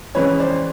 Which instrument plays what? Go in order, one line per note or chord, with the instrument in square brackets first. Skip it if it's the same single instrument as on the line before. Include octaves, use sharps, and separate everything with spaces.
[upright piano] F2 C#3 E3 G#3 C#4 B4 C#5
C5 D5